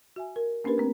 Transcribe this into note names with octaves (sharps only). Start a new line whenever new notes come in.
F#4 E5 G#5
A#4
A#3 C#4 D4 G4 A#4 B4
A3 C4